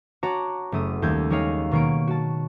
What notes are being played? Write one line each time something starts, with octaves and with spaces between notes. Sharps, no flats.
F#4 C#5 F#5 A5 A#5 D6
F#1 A3 D#6
D#2 G3 A3 G6 G#6
G3 G#3 D#4 C#5 D#5 F5
B2 D#3 A#3 C#5 D7
F#4 A5